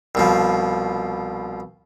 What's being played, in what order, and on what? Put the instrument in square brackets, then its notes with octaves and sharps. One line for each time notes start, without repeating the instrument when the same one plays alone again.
[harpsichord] C2 B2 F3